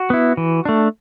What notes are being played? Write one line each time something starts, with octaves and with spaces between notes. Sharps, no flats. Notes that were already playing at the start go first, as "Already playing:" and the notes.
Already playing: F#4
B3 E4
E3
A3 D4